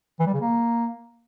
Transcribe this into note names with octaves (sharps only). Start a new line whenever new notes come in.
E3
G3
C#3
A#3